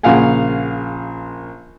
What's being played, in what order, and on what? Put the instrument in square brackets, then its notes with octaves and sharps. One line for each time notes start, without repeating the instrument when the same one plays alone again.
[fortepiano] A#1 C#3 F4 F5 F#5 G#5